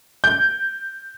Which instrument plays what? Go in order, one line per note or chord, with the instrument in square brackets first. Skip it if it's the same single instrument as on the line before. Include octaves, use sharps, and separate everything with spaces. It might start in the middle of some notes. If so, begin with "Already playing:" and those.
[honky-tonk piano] G6